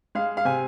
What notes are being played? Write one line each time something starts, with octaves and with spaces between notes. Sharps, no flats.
G#3 F5
F5
C3 G#5